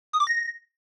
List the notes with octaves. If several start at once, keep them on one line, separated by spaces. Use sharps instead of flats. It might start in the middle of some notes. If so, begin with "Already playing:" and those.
D#6
D6
A#6